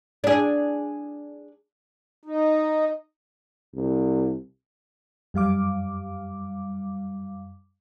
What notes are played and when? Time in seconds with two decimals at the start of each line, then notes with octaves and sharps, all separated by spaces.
0.24 D4 G#4
2.24 D#4
3.74 C2
5.34 F#2 G3 F5 D6